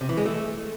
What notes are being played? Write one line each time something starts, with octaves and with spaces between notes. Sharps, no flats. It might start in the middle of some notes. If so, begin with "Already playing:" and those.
C3
E3
G#3
A3